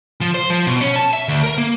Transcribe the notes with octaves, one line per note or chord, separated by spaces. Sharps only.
F3
C5
F3
B2
C#4
A5
E5
D2
A#4
A#3